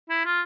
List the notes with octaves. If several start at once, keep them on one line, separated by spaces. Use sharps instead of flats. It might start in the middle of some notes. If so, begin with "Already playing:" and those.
E4
F4